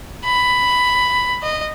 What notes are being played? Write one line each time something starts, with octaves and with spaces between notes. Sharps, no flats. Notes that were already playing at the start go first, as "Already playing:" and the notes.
B5
D#5